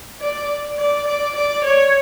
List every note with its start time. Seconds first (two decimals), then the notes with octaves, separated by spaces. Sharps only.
0.21 D5
0.78 D5
1.07 D5
1.35 D5
1.64 C#5